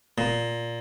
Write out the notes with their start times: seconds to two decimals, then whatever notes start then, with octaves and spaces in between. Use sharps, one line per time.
0.18 A#2